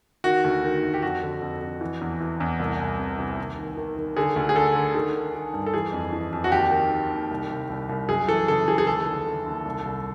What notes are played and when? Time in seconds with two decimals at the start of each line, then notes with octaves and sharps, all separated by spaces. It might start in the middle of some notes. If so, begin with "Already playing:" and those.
0.24 D#3 F#4
0.44 D2
0.64 D#3
0.83 D2
0.94 G4
1.02 F2 F#4
1.23 D3
1.42 F2
1.61 F2
1.81 E3
2.01 E2
2.21 E3
2.40 E2
2.60 C2
2.80 C2
2.99 C3
3.19 C3
3.38 D#2
3.58 D#3
3.77 D#3
3.97 D#3
4.17 D3 G#4
4.36 D2
4.49 G#4
4.56 D3 A4
4.75 D3
4.95 D#3 G#4
5.15 D#3
5.35 D#3
5.54 G2
5.66 A4
5.73 E3 G#4
5.93 F2
6.13 E3
6.33 F2
6.44 F#4
6.52 D#2 G4
6.71 D#3
6.91 D#3
7.11 D#2
7.31 C2
7.50 C2
7.70 C2
7.89 C2
8.09 F#2 G#4
8.28 E3 A4
8.48 C#3 A4
8.68 E3 G#4
8.78 G#4
8.87 D#2 A4
9.06 D3
9.27 D3
9.46 D#2
9.66 C2
9.85 C2